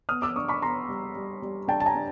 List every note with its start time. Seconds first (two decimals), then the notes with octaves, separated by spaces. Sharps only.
0.09 B3 D#6 F6
0.22 D6 E6
0.36 D4 C#6 D#6
0.48 B5 C#6
0.62 B3 A#5 C6
0.88 G3
1.16 G3
1.42 G3
1.68 D4 G5 A5
1.80 A5
1.86 G#5 A#5
1.94 D4